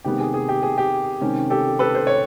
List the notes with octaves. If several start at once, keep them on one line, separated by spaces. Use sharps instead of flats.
C3 D#3 G#3 B3 G4
G#4
G#4
G4
G#4
G4
C3 D#3 G#3 C#4
G4 A4
A4 B4
C5
C#5